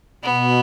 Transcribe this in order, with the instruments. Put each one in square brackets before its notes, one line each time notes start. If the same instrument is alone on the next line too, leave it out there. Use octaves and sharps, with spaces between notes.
[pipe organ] B2 [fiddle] B3